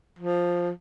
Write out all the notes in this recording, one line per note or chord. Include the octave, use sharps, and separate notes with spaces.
F3